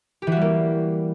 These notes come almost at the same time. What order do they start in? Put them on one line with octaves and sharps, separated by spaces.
G4 E3 F#4 G3 A#3